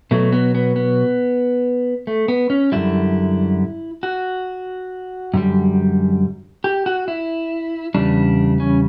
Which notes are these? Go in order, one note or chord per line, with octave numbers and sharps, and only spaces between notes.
B2 F#3 A3
B3
B3
B3
A3
B3
C#4
F#2 D3 G3 E4
F#4
F#2 D3 G3
G4
F#4
E4
E2 C#3 G3 D4
C#4